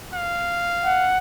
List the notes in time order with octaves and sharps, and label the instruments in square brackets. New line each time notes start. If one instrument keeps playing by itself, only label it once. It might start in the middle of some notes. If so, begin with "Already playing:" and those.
[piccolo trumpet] F5
[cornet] F#5